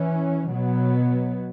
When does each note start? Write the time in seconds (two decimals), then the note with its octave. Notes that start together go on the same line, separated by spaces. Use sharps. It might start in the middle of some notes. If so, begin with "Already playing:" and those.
Already playing: E3 C#4
0.48 B2 F#3 B3